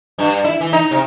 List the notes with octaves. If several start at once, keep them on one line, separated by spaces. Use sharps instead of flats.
G2
E4
E3
D#4
C3